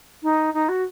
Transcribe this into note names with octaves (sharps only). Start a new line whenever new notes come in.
D#4
D#4
F#4